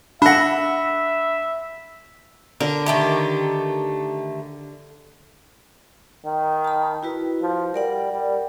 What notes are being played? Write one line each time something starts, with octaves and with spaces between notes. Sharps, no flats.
D3 D4 E5 F#5 B5 A#6
D3 A#4
D#3 A3 G4
D#3
A5 B5
E4 F#4 B4
F3
G3 A#4 D5 F#5
G3